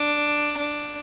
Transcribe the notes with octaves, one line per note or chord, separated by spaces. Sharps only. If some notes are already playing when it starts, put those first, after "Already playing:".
Already playing: D4
D4